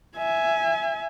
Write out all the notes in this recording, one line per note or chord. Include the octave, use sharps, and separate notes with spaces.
E5 G#5